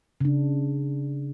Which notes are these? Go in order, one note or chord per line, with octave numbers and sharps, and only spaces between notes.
C#3 D4